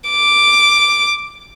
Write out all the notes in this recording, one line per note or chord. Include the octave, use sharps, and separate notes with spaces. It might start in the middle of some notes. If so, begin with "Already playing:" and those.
D6